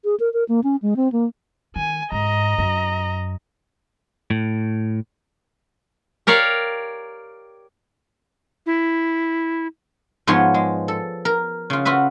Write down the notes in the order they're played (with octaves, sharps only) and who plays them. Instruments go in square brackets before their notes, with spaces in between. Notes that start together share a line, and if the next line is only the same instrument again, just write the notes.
[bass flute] G#4
A#4
A#4
A#3
C#4
G#3
C4
A#3
[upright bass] D#3 [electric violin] G#5
[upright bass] G#2 [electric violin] D#5 A#5
[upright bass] F#2
[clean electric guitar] A2
[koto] G4 A#4 C#5 D5 F5
[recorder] E4
[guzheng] G#2 F3 B3 F4 C#5 C6
G#3
A4
A#4
C#3 F4
F4 F#4 B4 E5